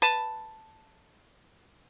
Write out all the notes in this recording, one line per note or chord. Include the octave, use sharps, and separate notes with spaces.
B4 A5